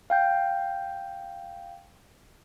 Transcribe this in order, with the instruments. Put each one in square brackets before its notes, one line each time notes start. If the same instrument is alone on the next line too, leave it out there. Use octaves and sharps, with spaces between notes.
[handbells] F5 G5 G6